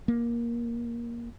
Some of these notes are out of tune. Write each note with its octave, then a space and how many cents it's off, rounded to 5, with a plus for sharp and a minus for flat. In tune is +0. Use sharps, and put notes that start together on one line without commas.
A#3 +15